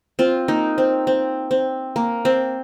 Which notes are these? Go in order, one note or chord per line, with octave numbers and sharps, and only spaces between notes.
C4 F4
A#3 D#4
C4
C4
C4
A#3
C4